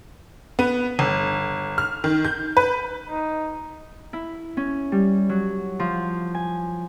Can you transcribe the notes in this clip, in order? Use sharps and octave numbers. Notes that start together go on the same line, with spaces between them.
B3
G1
F6
D#3
G6
B4
D#4
E4
C#4
G3
F#3
F3
G#5